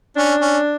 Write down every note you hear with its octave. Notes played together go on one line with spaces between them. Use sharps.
C#4 D4
C#4